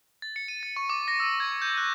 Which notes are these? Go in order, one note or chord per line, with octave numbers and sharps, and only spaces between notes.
A6
C#7
D#7
A6
C#6
D6
A#6
E6
G#6
G6
F#6